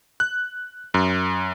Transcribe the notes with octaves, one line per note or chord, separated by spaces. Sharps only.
F#6
F#2